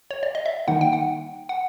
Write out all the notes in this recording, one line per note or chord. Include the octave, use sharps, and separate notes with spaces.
C#5
D5
D#5
E5
D#3 G3 A#3 D#4 F#5
G5
F#5
F#5